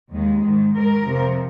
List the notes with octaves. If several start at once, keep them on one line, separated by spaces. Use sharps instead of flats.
D#2 D#3 G#3
G#2 D#3
G#2 D#3 A#4
F2 C3 F3